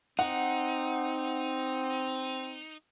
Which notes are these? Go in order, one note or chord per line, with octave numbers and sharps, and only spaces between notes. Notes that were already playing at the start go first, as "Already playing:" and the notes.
C4 D#4 F#5